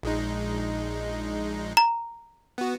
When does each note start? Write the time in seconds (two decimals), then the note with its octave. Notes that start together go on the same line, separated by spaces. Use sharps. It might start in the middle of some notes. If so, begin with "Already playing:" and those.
0.03 A#1 G#3 D#4
1.77 A#5
2.58 B3 F#4